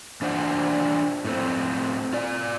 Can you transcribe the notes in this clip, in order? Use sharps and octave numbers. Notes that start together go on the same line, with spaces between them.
E3 D4 F4 C5 D5 F#5
A2 A3 C4
F4 D5